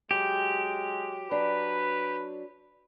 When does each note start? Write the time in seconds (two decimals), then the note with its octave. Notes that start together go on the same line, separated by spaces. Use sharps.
0.11 F#3 G#3 G4
1.31 F#3 D4 B4